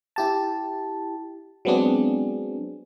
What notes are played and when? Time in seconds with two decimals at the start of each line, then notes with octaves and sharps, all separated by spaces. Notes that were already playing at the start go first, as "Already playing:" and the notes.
0.16 E4 G4 A5
1.65 F#3 G#3 B3 C4 D4 G#4